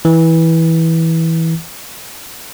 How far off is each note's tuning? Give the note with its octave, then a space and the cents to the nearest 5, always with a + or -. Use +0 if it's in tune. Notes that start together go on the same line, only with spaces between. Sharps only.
E3 -15